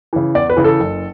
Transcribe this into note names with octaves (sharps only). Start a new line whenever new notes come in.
C#3 E3
E2 D5
B4
C#3 E3
A4
F#1